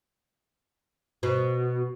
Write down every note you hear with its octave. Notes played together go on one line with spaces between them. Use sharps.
B2